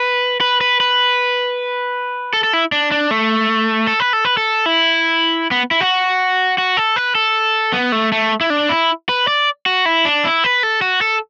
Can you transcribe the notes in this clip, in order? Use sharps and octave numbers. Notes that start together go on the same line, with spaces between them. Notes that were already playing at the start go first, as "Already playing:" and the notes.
Already playing: B4
B4
B4
B4
A4
A4
E4
D4
D4
A3
A4
B4
A4
B4
A4
E4
B3
E4
F#4
F#4
A4
B4
A4
B3
A3
A3
E4
D4
E4
B4
D5
F#4
E4
D4
E4
B4
A4
F#4
A4